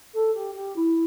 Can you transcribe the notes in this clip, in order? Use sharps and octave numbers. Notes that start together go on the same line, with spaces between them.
A4
G4
G4
E4